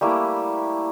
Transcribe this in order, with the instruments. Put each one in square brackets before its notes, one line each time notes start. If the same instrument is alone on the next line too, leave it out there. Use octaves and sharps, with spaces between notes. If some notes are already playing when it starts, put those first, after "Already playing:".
[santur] G3 A3 A#3 E4